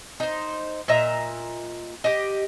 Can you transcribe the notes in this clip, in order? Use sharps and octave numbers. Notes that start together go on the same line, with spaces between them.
D#4 C5
A#2 D#5 E5 A#5
G4 D#5